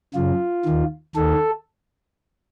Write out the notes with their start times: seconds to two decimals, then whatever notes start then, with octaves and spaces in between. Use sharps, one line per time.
0.14 F#2 C#3 F4
0.65 D#2 D#3
1.15 D#2 D#3 A4